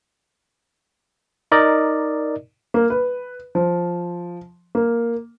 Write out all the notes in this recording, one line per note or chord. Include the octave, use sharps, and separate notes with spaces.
D#4 A#4 D5 D#5
A#3
B4
F3
A#3